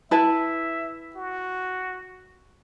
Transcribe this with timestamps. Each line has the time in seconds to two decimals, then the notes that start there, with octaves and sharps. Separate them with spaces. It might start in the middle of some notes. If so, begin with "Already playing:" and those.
0.11 E4 B4 E5 A5
1.16 F#4